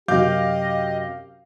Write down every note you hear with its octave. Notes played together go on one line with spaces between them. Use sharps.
F#2 C3 G4 D#5 F5 D6 G6